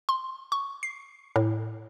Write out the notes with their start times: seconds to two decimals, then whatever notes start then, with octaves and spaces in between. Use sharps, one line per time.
0.09 C6
0.52 C#6
0.83 C7
1.36 A2